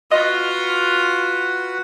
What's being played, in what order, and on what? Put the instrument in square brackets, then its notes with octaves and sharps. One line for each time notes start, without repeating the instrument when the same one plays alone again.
[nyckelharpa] F4 [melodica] F#4 B4 F#5 [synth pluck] D#5